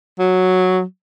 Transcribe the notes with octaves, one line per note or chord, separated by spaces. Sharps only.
F#3